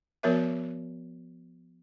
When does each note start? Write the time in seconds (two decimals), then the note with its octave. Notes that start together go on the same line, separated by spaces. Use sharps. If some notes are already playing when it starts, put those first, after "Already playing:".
0.23 F3 B3 F#4 A#4 C#5 E5